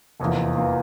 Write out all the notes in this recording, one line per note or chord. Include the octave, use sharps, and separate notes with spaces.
F1 E2 E3 A#3 F4
E3 A#3 F4